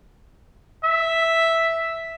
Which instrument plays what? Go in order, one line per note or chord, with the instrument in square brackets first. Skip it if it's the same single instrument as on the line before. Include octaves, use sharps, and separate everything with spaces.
[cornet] E5